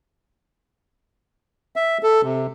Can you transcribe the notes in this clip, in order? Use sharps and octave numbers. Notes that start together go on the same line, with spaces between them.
E5
A4
C3